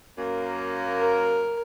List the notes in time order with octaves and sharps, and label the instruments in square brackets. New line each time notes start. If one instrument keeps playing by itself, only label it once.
[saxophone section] F#2 A#3
[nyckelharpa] A#4